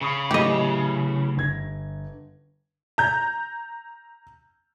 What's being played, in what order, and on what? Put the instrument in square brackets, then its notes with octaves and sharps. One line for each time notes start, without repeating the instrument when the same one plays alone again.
[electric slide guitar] C#3 [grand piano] B5 C#6 D#6
[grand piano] A2 E3 F#3 [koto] G4 D#5
[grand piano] G1 G#6 A#6
[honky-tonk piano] A#5 G6